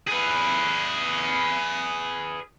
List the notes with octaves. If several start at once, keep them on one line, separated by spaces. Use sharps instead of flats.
G#4 B4